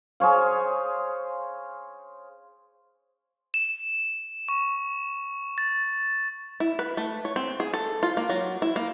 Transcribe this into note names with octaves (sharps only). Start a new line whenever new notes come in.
G#4 C5 C#5 F5
E7
C#6
A6
E4
B4
A3
C#5
C4
G#4
A4
F4
A#3
F#3
E4
A#3